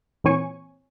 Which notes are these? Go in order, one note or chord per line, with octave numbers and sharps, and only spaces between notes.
A#2 E3 C4 C#5 G#5 C#6